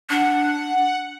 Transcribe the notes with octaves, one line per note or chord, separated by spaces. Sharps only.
D4 F#5